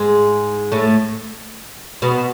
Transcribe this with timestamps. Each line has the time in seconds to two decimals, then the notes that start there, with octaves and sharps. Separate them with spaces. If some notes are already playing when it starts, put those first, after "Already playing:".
Already playing: G#2 G#3
0.72 A2 A3
2.02 B2 B3